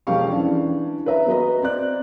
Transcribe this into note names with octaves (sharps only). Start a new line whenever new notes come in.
E1 F2 G4 F5 C#6
E3 C#4 D4
B4 C#5 E5 A#5
B3 F#4 B4 D#5 A#5
C4 D5 F#6